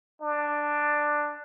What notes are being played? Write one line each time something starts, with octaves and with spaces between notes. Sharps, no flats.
D4